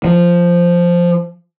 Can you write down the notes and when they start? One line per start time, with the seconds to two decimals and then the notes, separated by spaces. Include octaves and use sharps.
0.05 F3